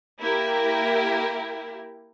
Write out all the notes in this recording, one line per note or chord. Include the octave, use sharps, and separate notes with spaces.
A#3 E4 G4 A#4